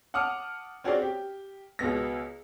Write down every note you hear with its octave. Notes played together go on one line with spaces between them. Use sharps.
F#5 A5 D6 D#6 F6
C4 C#4 F#4 G#4 C5 D5
G4
C#2 B2 B3 A#6